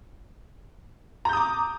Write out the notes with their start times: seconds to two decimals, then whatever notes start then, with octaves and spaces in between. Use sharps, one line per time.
1.25 A#5
1.29 G6
1.33 D#6
1.37 D6